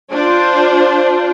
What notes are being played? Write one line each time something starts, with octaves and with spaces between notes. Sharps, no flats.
D4 F4 C5